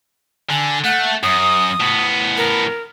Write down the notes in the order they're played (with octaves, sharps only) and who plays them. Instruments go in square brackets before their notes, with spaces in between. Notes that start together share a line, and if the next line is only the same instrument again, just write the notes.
[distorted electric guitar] D3 [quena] G#5
[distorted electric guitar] A3 [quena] F#5
[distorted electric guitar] F#2 [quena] D#6
[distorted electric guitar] A2 B3
[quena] A#4